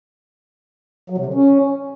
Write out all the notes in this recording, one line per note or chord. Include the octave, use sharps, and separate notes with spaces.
F#3
C3
D3
C#4